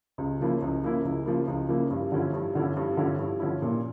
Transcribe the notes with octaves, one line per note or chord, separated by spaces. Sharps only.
C#2
C#3 F3 A#3 E4
C#2
C#3 F3 A#3 E4
C#2
C#3 F3 A#3 E4
C#2
C#3 F3 A#3 E4
G2
D3 F3 C#4 E4
G2
D3 F3 C#4 E4
G2
D3 F3 C#4 E4
G2
D3 F3 C#4 E4
A#2